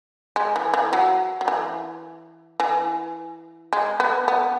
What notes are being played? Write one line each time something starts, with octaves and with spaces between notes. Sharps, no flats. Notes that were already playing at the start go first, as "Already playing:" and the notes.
G#3
E3
E3
F#3
F#3
E3
E3
G#3
B3
B3